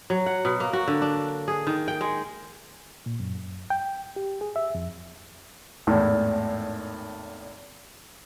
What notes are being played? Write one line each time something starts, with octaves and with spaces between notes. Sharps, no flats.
F#3
F#5
B2
A#3
F#4
D3
D4
G#4
D#3
G5
G#3
A#2
F#2
G5
G4
G#4
E5
F2
G#1 E2 A2